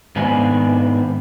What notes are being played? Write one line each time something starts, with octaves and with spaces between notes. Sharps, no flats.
G#2 D#3 B3 C4 D4 G#5